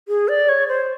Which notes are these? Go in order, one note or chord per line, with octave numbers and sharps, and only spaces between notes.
G#4
D5
C#5
C5